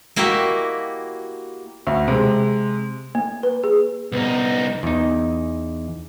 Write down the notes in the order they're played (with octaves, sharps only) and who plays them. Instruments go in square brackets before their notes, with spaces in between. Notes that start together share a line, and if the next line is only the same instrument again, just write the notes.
[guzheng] A#3 E4 F#4 G4 D#5 E5
[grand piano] D2
C3 G#3
[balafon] A#3
B4
G#4
[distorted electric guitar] C2 D#4 [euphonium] B3
[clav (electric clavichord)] E2 D#4